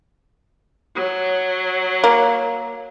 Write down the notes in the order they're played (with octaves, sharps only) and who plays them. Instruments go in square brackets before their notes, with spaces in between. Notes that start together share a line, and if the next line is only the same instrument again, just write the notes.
[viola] F#3
[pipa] A#3